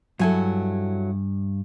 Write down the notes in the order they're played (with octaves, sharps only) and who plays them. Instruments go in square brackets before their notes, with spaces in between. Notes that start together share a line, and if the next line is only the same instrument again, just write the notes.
[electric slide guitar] G2 G#5 [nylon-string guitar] F#3 E4 A4